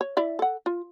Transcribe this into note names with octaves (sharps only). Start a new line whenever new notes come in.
C#5
E4 D5 E5
A4 F#5
F4